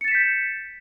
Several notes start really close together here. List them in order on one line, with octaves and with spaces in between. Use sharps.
C#7 A6 E7 B6 G6